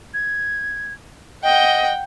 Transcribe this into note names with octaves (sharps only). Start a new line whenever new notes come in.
G#6
D#5 F#5 G5